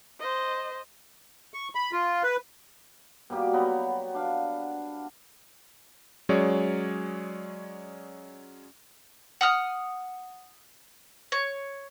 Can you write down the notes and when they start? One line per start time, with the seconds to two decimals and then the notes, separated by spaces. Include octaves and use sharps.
0.20 C5 D#5
1.54 C#6
1.75 B5
1.92 F4
2.23 B4
3.30 B2 G3 A#3 G4
3.52 F#3 B3 A#5 B5
4.14 D4 B4 F5
6.29 F#3 G#3 C#4 G#4 C#5 D5
9.41 F#5 D#6 F6
11.32 C#5